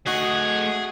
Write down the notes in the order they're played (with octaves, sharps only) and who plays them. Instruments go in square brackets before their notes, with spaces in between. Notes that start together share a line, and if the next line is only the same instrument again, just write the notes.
[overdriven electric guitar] A3 D#5 [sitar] F#4 [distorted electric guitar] G#4